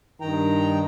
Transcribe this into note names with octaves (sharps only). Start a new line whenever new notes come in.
G2 D#3 G5 A#5